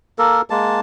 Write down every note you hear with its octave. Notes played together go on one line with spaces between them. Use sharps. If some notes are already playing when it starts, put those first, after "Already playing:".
A#3 A4 A#4
G#3 A#3 A5